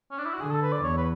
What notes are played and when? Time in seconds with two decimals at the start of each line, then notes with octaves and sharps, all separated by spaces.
0.11 C#4
0.18 D4
0.25 E4
0.34 F#4
0.40 D3 G#4
0.51 A4
0.62 B4
0.72 D5
0.83 E2 C#5
0.97 B4